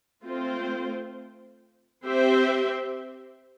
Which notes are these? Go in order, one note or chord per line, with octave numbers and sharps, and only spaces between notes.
A3 C4 F4 C5
C4 G4 C5 E5